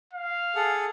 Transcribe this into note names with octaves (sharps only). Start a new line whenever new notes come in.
F5
G#4 A4 F#5